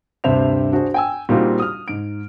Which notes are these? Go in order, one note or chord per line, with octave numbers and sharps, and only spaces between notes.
D2 G2 C3 C5 E5 F7
D4 F#4 G#4 C5
G5 G#5 E6
A#2 G3 C4 D#4 F4 F#4
D#6 F6
G#2 D7